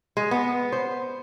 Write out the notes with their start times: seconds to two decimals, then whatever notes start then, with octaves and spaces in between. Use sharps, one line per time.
0.17 G#3
0.31 B3
0.72 C5